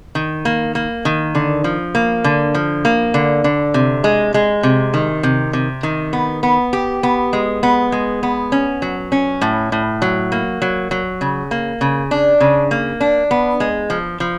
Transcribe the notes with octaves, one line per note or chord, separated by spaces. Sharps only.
D#3
A#3
A#3
D#3
D3
F3
A#3
D3
F3
A#3
D3
D3
C3
G#3
G#3
C3
D#3
C3
C3
D#3
B3
B3
G4
B3
G#3
B3
G#3
B3
C#4
F#3
C#4
A2
A2
F#3
A#3
F#3
F#3
C#3
A#3
C#3
D4
C#3
A#3
D4
B3
G#3
F3
F3